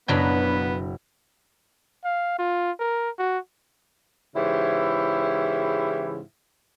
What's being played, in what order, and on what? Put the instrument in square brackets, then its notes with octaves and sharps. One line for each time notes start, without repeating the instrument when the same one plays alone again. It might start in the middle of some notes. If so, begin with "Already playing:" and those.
[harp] F#1 A#5 B5 [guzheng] B2 F#3 D4 [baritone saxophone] B3
[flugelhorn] F5
F4
A#4
F#4
[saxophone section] G#2 C#3 E3 E4 G4